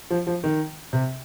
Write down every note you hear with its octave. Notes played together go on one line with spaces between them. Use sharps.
F3
F3
D#3
C3